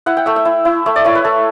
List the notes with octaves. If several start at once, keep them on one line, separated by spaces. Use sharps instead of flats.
E4 F#5
G5
A3 E5
E5
E4
E4
A3 E5
D5
E4 C#5
B4
A3 A4